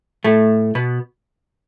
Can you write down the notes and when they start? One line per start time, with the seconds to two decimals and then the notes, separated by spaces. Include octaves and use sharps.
0.24 A2 A3
0.75 B2 B3